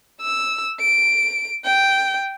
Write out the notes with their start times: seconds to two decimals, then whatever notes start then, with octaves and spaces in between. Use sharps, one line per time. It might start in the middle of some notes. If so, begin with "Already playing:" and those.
0.22 E6
0.80 D7
1.65 G5